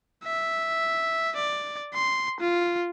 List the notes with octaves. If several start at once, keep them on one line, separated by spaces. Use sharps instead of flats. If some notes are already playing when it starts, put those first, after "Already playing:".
E5
D5
C6
F4